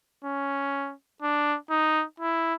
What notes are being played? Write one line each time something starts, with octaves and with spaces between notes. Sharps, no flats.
C#4
D4
D#4
E4